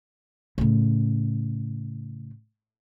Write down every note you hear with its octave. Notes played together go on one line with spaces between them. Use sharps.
A2 C#3